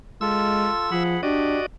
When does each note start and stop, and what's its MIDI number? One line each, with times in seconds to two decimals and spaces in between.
0.21 0.68 56
0.21 0.90 65
0.21 0.90 69
0.21 1.03 88
0.91 1.17 53
0.91 1.21 68
0.91 1.21 78
0.91 1.21 83
1.23 1.57 62
1.23 1.66 66
1.23 1.60 67
1.23 1.66 74
1.23 1.66 75